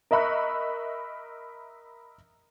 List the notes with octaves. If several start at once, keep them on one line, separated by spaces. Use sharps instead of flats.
A#4 D#5 E5 B5 C#6 F#6